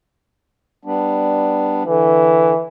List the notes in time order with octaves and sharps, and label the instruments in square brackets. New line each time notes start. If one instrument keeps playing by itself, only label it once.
[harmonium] G3 B3 D4
[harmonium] D3 [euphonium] E3